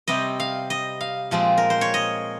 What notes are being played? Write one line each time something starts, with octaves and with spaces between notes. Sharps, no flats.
C3 G3 C4 D#5
F5
D#5
F5
A#2 F3 G#3 C4
A#4
C5
C#5
D#5